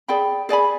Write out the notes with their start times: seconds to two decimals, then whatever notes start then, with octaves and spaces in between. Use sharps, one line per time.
0.08 G#4 D5 G5 B5
0.49 G#4 D5 G#5 B5